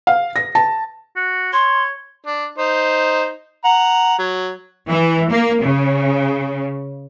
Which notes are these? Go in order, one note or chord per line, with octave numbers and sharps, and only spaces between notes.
F5
A#6
A5
F#4
C#5 C6
D4
D#4 C5
F#5 A#5
F#3
E3
A#3
C#3